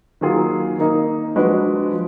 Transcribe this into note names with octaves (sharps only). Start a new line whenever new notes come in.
D#3 F#3 A#3 F4 G#4
D#3 A#3 D#4
F3 G#3 D4 F#4 B4
F3